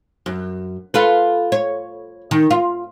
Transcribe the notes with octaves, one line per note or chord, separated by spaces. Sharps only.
F#2
F4 A4 B4
C#5
D#3
F4